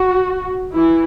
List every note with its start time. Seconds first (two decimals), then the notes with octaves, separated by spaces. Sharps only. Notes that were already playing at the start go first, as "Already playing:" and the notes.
Already playing: F#4
0.74 E3 E4